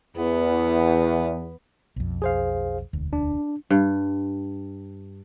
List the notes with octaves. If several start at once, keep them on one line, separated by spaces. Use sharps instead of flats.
E2 B3
B1 F2
G#4 C5 F5
E1 D2
D4
G2